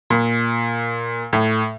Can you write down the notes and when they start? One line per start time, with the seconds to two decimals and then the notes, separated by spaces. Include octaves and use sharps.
0.10 A#2
1.33 A2